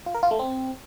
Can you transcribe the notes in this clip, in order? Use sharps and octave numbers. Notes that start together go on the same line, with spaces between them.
F4
A#4
F4
A3
C4